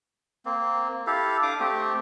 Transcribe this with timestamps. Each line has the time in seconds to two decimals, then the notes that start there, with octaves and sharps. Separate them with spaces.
0.45 A#3 C4
1.07 E4 G4 A4 F5
1.43 D4 F5 D6 D#6
1.60 A3 C4 G4